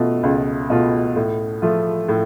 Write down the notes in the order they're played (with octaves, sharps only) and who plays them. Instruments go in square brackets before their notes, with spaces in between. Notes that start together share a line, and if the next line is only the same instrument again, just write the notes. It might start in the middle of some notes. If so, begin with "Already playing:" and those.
Already playing: [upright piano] B2 A3 F4
C#2
B2 A3 F4
A2
F3 A3 F4
A2